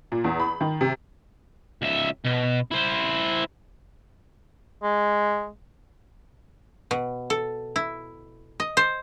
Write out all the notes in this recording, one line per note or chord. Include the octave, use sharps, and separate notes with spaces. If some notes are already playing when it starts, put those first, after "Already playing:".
A#2
E2
B5
D#3
C3
C#2 E5
B2
E4 C5
G#3
B2
A4
E4
D#5
C5